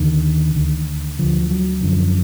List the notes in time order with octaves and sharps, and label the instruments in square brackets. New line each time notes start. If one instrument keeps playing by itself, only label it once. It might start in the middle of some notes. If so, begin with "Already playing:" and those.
Already playing: [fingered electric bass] D#2 D3 D#3
D2 D3
D2 D3 F3
F3
F#3
F#2 D3 F3